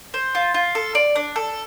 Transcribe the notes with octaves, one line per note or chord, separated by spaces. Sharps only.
C5
F4
F4
A4
D5
D4
A4